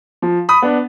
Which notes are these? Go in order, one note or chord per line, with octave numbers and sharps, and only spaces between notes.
F3
B5 D#6
B3 D4